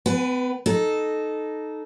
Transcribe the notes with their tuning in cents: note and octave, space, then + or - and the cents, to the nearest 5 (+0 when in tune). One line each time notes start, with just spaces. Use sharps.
B3 +45 B4 +5 G#5 +0
D#4 -10 A4 -15